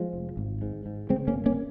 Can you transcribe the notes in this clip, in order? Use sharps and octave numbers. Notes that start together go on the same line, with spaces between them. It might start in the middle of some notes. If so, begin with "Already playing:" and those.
Already playing: F3 G#3
F1
G#1
G#2
G#2
C#3 G#3 C4
A#3 C#4
G1
A#3 C#4